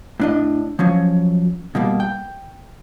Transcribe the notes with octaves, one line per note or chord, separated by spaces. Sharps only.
A2 D4 D#5
F3 F#3 C#4
B2 G3 A#3
G5